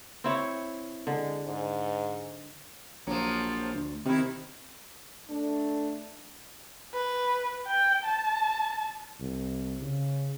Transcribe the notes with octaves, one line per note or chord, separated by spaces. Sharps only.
C4 E4 C#5
D3 G#3
G#2
A#1 F3 F#3
D2
C3 D#3 E4
A3 D4
B4
G5
A5
C2
C#3